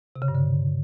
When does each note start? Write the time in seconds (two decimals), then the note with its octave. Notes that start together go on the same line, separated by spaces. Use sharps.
0.16 C3
0.22 C#3
0.28 G2
0.35 D3